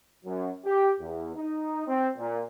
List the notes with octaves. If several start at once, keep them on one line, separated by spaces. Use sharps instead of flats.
F#2
G4
E2
D#4
C4
A#2